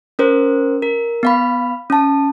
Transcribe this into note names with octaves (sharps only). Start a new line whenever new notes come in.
C#4 A#4 C5
A#4
B3 F5 B5
C#4 A5